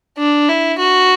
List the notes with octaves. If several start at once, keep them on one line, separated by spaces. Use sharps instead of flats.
D4
E4
F#4